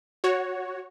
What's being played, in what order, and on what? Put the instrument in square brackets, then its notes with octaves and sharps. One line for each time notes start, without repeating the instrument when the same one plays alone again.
[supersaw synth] F#4 C#5